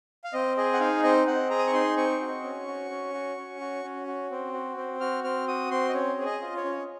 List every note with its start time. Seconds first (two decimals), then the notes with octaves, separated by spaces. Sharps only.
0.24 F5
0.33 C4 D#5
0.57 G#4 D#5
0.73 F#5
0.80 D#4 F5
1.03 C4 D#5
1.27 C4 F#5
1.50 G#4 A#5
1.59 D#6
1.67 C#6
1.73 D#4 C6
1.97 C4 C#6
2.21 F#4
2.44 C#4
2.68 F#4
2.90 C#4
3.14 F#4
3.38 C#4
3.60 F#4
3.84 C#4
4.07 F#4
4.31 C4
4.54 F#4
4.77 C4
5.00 F#4 F6
5.24 C4 F6
5.48 F#4 D#6
5.71 C4 C6
5.89 D#5
5.94 C#4 C#5
6.18 G#4
6.26 D#5
6.42 F4
6.56 C#5
6.64 C#4